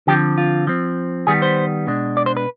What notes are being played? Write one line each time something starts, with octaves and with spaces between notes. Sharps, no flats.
D3 F3 C4 G4
F4
F3 C4
D#3 G3 B3 G#4
C5
B2 G#3 D4
D5
C5
B4